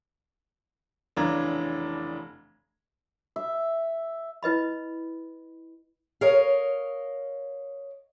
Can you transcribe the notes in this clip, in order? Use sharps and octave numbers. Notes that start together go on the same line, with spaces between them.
F1 C#3 E3 D4 A#5 G#6
E5
E4 B4 D#5 B5
A#4 C#5 D#5 F5